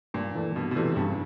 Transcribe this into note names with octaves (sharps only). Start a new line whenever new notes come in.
G2 A#2
E3 A3 D4
G2 B2
B2
C3 E3 A3 D4
G2 C#3